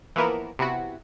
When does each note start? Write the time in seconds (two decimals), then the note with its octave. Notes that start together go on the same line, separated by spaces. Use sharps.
0.16 E3 F3 A#3 B3 E4 A#4
0.59 C3 B3 E4 F#4